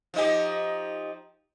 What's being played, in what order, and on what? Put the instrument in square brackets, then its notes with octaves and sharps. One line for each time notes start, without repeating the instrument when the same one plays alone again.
[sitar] F3 D#4 G4